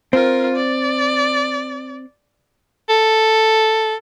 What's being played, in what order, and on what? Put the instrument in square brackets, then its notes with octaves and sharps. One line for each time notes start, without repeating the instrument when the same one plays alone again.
[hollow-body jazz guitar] C4 [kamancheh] F4 A#4
[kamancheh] D5
[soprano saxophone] A4